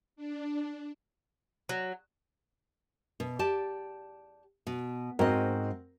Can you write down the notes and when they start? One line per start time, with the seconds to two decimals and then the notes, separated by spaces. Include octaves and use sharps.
0.16 D4
1.69 F#3
3.20 B2
3.39 G4 D5 A5
4.67 B2
5.19 G#2 C4 F#4 A#4 D#5